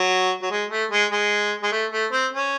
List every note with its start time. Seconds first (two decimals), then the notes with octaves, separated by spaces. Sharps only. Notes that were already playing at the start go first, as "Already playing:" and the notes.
Already playing: F#3
0.42 F#3
0.51 G#3
0.70 A3
0.91 G#3
1.11 G#3
1.62 G#3
1.72 A3
1.92 A3
2.12 C4
2.33 C#4